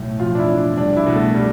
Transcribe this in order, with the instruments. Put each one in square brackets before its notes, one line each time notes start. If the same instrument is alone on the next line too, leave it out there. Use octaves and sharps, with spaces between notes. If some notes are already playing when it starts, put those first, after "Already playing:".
Already playing: [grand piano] B1 A2
[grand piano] F2 [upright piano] F4
[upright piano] D4
E4
[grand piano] E3
[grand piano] C2 [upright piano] D4
[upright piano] E4
[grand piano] B2
[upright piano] A3
G3